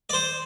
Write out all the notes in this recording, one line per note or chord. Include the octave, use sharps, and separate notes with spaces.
D5
C5